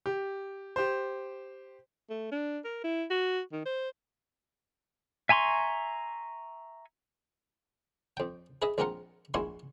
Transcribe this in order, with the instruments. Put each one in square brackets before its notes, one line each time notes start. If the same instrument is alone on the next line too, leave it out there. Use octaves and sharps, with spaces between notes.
[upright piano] G4
G4 C5
[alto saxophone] A3
D4
A#4
E4
F#4
D#3
C5
[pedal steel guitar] E5 G#5 A#5 C6 C#6
[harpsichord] F2 G5
G#4 B4 D#5 E5
A#1 G#3 C4 F4 A#4 F#5
A#1 G#3 E4 F#4 G#5 C6